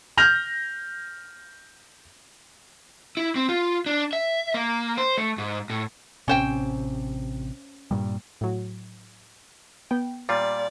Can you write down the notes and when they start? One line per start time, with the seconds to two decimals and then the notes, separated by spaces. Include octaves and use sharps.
0.18 F6 G6 A#6 F7
3.17 E4
3.36 C4
3.49 F4
3.86 D4
4.13 E5
4.54 A#3
4.97 C5
5.18 A3
5.38 G#2
5.70 A2
6.28 A1 C3 C#4 C5 G5
7.91 G2 A#2 G3
8.41 A2 F#3
9.91 B3 G5
10.29 A#2 G3 F4 D5